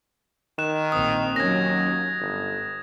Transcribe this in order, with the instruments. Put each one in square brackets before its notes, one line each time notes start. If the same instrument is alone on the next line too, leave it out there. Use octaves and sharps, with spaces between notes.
[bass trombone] D#3 [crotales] F#6 E7
[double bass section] A#1 C4 [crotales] D#6
[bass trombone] D#2 [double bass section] F#3 C#4 [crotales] G#6 A#6
[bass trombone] G1 [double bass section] G2